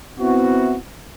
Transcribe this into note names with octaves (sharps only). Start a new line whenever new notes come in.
B3 C4 E4 F#4